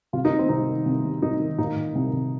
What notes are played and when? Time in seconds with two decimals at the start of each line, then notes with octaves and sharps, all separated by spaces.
0.13 C2 F4
0.25 D#4
0.32 C3
0.39 C4
0.49 C2 D#4
0.67 D#3
0.86 C2
1.04 C3
1.22 C2 D#4
1.40 D#3
1.58 A#2 D#4
1.76 A#2
1.95 C2
2.13 C2